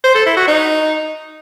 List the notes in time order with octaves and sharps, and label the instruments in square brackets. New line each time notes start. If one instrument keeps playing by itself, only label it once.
[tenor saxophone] C5
A4
E4
F#4
D#4